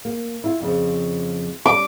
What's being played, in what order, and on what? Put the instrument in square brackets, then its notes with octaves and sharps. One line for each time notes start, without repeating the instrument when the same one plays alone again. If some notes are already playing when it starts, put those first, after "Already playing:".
[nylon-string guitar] A#3
E4 F4
F2 C#3 F3
[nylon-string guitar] G3 C#4 [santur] D6